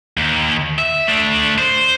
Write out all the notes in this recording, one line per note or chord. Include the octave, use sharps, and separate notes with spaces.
D#2
E5
A3 D4
C5